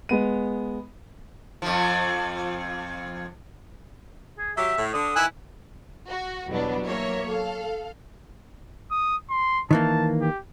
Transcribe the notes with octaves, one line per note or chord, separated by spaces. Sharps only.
G#3 B3 D#7
F2 F3
G#4
F#3 G4 E5
A2
D3 D#6
D#3 E3 E4 G#5 E6 F#6
F#4
E2 B2 F#3 G3 B3 D4
F#3 A#3 A#4 C#5 E5
A4 F5
D#6
C6
D#3 E3 A#3 A5
G4